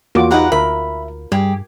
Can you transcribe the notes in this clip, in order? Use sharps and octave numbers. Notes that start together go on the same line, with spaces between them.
E2 A#3 F4 F#4 D6
D#4 G4 A#4 B4 F#5
D2 A#4 E5 B5
G2 G3 G4 G#4